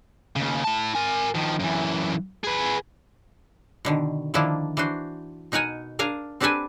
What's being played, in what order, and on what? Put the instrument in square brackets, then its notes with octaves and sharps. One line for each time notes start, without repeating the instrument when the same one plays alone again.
[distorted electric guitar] D#2 C#3
E4 A5
A#4 G#5
D#3 F3
F#2 E3
G#4 B4
[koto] B2 D3 D#3
D3 D#3 F3 A#3 D4 E4
E3 D4 F#4 C5
B2 D#4 A#4 F#5 G#5
D4 A#4 F5 G#5 A#5
C4 D4 G4 A4 B4 G#5